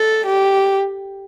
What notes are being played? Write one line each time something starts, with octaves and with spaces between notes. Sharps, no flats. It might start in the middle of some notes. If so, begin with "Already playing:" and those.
Already playing: A4
G4